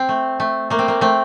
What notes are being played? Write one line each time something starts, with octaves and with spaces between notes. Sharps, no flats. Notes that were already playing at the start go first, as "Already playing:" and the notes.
Already playing: C4
A3
A3
A3 A#3
C4
A#3
A3 C4